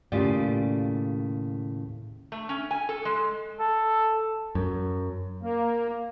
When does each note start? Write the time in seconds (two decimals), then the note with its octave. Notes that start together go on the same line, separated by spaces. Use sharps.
0.12 D#2 A2 C#3 F4 G4 D5
2.32 A3
2.49 C#4
2.71 G#5
2.89 A4
3.05 G#3
3.60 A4
4.55 F#2
5.43 A#3